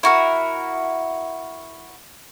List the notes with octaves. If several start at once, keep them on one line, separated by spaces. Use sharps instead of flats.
E4 F#4 A#4